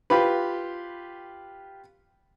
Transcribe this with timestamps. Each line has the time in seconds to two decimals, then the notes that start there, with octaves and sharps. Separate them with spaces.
0.10 F4 G4 B4